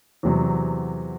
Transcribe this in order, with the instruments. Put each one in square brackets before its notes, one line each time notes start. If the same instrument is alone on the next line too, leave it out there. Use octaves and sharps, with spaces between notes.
[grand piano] E2 C3 F#3